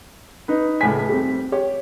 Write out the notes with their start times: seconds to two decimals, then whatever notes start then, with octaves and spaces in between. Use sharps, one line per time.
0.48 D#4 B4
0.81 C#2 A2 G#5 B6
1.08 G3 A3 C4
1.52 G4 C#5